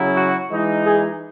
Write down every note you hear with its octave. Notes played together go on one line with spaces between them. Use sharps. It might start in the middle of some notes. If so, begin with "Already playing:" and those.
Already playing: C#3 F#3 C#4 E4
F#4
E3 G#3 D#4
G#4